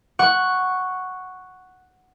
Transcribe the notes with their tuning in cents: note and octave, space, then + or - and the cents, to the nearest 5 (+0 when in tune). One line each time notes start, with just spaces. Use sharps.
F#5 +0 C#6 +0